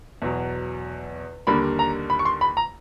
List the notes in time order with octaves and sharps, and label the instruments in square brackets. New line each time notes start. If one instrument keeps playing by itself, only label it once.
[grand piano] E2 B2 F#3
D#2 D3 G3 A#3 B5
A#5
B5
C#6
C6
B5
A#5